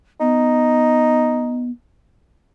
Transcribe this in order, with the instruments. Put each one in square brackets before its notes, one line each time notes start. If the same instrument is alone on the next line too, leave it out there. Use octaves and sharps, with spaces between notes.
[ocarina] B3 [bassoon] D#4